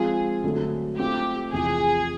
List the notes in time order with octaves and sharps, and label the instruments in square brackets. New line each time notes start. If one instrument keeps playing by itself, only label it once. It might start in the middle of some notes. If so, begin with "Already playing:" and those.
Already playing: [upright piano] F3 G#3 C4 F4 [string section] G#4
[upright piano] D3 F#3 A3 C4
[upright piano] A3 C4 F4 [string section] G4
[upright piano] E2 C3 F3 [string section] G#4